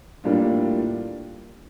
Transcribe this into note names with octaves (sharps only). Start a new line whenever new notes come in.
A2 G3 A#3 D4 F4